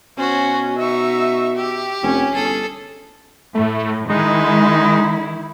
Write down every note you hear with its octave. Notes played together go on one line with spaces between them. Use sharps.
B2 C#4 F#4 C5
D#4 E5 C#6
G4
F1 C#4
G1 G#4 A4
A2 A3
D#3 G#3 D#4 E4